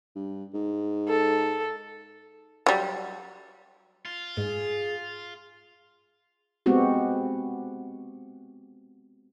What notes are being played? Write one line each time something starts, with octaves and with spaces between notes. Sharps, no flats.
G2
G#2
A4
F#3 G3
F4
G#2 G#4
G#3 B3 C4 F#4 G4